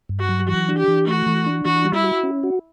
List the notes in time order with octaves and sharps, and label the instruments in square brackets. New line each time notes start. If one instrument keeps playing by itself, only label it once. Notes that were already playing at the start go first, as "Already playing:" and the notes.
[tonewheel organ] G2
[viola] F#4
[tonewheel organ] F#3
[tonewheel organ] E3 [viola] F#4
[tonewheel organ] D4
[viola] G4
[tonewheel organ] E3
[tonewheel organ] A3 [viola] F#4
[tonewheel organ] E3
D4
[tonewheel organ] E3 [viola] F#4
[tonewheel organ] G3
[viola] E4
[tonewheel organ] F#4
C#4
F#4